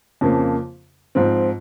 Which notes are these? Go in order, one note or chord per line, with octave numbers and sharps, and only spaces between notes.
F2 C#3 F3 A#3
G#2 F3 C4